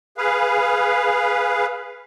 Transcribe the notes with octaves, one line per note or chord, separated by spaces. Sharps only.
G#4 B4 F5